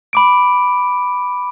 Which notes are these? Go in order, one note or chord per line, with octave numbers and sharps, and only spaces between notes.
B5 D6 D7